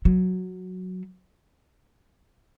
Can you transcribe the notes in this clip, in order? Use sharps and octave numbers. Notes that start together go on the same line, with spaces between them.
F#3